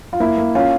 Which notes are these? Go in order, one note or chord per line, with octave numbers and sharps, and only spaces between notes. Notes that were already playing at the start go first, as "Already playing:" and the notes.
F4
A#3 E4
A#3
C#4 F4